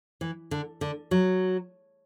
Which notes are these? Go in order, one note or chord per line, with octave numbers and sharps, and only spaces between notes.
E3
D3
D3
F#3